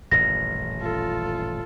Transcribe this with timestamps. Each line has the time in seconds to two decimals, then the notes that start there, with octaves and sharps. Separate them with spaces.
0.12 D#1 A1 F#2 A#6
0.81 F4 A4